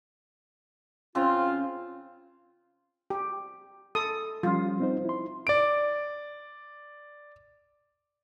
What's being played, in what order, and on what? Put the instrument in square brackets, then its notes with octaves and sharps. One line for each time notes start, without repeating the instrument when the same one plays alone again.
[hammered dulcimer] C#3 C4 [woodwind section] F4
[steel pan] G4
A4 D#6
[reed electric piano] F3 G3 C#4 [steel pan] F4
[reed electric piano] C4 D#4 C5
E4 C6
[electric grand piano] D5 D7